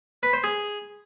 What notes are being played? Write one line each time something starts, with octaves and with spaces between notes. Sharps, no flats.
B4
C5
G#4